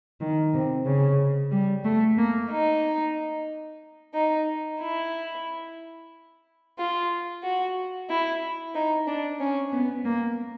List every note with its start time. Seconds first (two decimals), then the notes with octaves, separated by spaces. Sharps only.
0.21 D#3
0.53 C3
0.86 C#3
1.51 G3
1.84 A3
2.17 A#3
2.50 D#4
4.14 D#4
4.80 E4
6.77 F4
7.43 F#4
8.09 E4
8.74 D#4
9.07 D4
9.40 C#4
9.72 B3
10.05 A#3